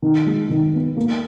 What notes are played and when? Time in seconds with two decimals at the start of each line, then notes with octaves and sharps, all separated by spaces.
0.02 D#3
0.26 G#3
0.50 D#3
0.74 B3
0.97 A#3